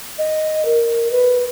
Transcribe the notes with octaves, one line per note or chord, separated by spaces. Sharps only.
D#5
A#4
B4